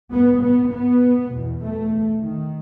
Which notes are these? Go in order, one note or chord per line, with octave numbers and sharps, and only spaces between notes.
G#2 B3
B3
B3
E2 B2
A3
D#3